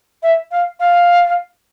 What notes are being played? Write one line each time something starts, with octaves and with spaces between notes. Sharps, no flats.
E5
F5
F5